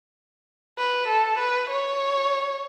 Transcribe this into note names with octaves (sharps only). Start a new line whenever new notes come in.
B4
A4
B4
C#5